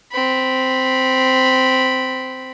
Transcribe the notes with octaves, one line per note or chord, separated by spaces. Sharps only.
C4 B5